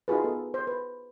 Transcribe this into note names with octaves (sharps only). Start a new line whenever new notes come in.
D#4 F4 F#4 G#4 B4
B3 A4
C5
B4